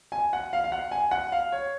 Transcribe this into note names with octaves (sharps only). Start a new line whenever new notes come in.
G#5
F#5
F5
F5
F#5
G#5
F#5
F5
C#5